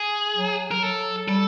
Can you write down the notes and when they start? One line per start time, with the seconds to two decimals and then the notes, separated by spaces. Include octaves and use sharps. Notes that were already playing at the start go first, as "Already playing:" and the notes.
Already playing: G#4
0.36 F#3
0.71 A#4
0.82 F#3 A4
1.28 G3 A4